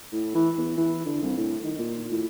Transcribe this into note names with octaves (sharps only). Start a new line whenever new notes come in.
A2
E3
E2
E3
D3
C2
A2
D#3
A#2
A2